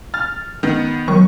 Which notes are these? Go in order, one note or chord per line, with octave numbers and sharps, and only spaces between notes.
F6 A6
D#3 B3
D#3 F#3 C#6